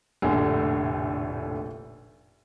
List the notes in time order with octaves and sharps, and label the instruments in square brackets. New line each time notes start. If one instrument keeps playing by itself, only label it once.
[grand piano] F1 A2 D3 [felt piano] A#1 G#5